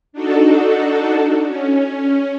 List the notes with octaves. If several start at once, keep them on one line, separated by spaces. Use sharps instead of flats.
D4 D#4 F#4 A4
C#4